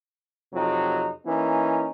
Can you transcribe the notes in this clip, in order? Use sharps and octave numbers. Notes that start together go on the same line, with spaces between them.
F2 C3 F#3 D#4
E3 A#3 C#4 D#4